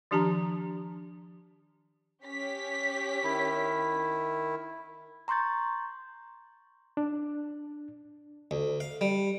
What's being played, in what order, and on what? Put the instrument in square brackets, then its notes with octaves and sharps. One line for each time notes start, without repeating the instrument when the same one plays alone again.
[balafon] D#3 F3 D4 G4 A5 A#5
[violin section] C#4 G4 B6
[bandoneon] D#3 E4
[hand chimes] A#5 C6 C#6 G6 A6
[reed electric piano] D4
[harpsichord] D2
F5
G3